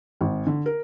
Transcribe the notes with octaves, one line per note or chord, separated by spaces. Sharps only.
G#1
D3
A#4